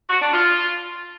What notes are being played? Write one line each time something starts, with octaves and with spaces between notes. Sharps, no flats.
F#4
D4
F4